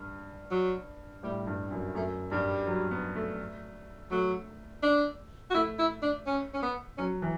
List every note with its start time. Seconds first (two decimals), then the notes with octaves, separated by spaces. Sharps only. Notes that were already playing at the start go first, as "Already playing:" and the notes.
Already playing: G2
0.51 F#3
1.23 A2 G3
1.47 G2
1.71 F#2
1.95 F#2 A3
2.31 G2 G3
2.67 F#3
2.91 B3
3.15 A3
4.11 F#3 A3
4.83 D4
5.50 F#4
5.55 A3 E4
5.79 E4
6.02 D4
6.26 C#4
6.54 C#4
6.62 B3
6.98 F#3 C#4
7.22 E3